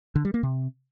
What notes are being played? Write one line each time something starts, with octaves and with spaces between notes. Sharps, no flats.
D3
G3
A#3
C3